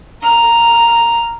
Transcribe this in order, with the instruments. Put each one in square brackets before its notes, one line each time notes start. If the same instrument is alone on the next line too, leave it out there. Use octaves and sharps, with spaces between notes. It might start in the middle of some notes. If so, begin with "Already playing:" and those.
[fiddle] A#5 F6